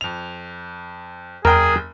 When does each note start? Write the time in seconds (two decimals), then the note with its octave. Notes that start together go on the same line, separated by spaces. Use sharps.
0.01 F2 F7
1.45 F#1 E2 G#4 A#4 G5